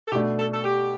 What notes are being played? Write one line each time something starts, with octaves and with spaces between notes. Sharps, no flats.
A4
B2 A3 D4 G4
A4
A4
G4